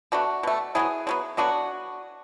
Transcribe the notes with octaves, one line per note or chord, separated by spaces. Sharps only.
B2 A3 D4 F#4
B2 A3
D3 F#3 B3 E4 G#4
D3 F#3 B3
D3 F#3 B3 D4 F#4